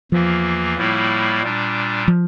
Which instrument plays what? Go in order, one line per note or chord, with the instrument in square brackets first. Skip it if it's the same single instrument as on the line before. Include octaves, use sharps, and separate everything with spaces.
[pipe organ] E2 E3 A#3 [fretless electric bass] F3
[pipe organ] A2 G3 A#3 E4
A#2 G3 D4
[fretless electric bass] F3